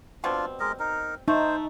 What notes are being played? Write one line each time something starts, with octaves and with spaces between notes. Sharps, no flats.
B2 G3 C4 D4 F4
G#3 A#4 D#5
D#4 A#4
A3 D#4 C5